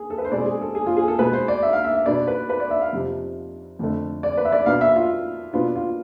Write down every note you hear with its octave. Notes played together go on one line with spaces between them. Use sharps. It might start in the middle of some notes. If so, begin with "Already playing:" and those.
Already playing: G#4
A4
B4
C5
B2 G#3 C4 D5
G#4
A4
G#4
F4
G#4
A4
B2 G#3 B3 B4
C5
D5
E5
F5
E5
E5
B2 B3 D4 D5
B4
B4
D5
E5
F5
F2 C3 F3
F2 D3 A3
D5
B4
E5
D5
B2 B3 D4 F5
E5
F4
B2 B3 D4 F4
F4